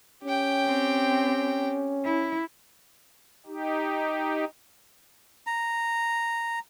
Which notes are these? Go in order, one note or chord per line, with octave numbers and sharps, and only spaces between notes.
C#4 G4 G5
C4
E4
D#4 G4
A#5